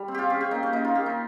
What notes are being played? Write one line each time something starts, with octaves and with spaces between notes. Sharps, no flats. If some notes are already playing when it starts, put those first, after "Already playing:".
Already playing: G3
C4
F4 G4
C#4 G#4
G4
A#3 D#4
C#4
A#3 D#4
F4
A#3 G4
D#4